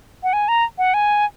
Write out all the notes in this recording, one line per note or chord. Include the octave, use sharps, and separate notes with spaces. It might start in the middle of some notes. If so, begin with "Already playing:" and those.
F#5
G#5
A#5
F#5
G#5